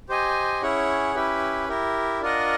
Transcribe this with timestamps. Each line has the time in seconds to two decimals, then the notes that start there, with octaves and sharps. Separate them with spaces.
0.09 G4 C5 D#5 G#5
0.62 C#4 E4 G#4 C#5 F#5
1.15 C#4 E4 G4 B4
1.68 E4 G4 A#4
2.21 D4 F4 A#4 D#5 F#5